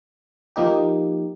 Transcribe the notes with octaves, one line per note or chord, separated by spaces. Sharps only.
F3 A#3 D#4 G4